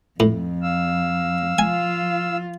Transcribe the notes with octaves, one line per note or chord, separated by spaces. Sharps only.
F2 A2
F5 E6
F3 F4 G#5